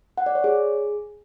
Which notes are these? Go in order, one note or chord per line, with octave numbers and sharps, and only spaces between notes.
F#5
D5
C#5
G#4